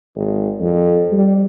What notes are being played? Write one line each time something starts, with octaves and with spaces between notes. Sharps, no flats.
G#1
F2
G3